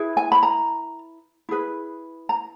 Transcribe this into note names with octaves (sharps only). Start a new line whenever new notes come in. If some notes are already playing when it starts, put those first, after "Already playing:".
Already playing: E4 G#4 B4
G#5
B5
A#5
E4 G#4 B4
A#5